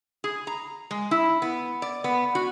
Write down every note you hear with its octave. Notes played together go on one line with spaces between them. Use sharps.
G#4
A#5
G#3
E4
B3
D5
B3
F#4